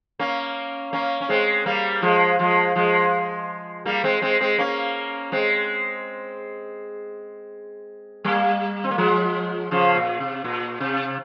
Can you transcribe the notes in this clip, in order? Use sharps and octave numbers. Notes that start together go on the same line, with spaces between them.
A#3 C#4
A#3 C#4
C#4
G#3 C4
G3 A#3
F3 G#3
F3 G#3
F3 G#3
G3 A#3
G#3 C4
G#3 C4
G#3 C4
A#3 C#4
G#3 C4
G3 A#3
C4
A#3
F3 G#3
C#3 F3
A#2
C3
A#2
C3